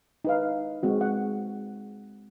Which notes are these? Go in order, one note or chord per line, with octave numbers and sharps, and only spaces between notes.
D#4 B4 F5
G#3 C4 F#4
F#5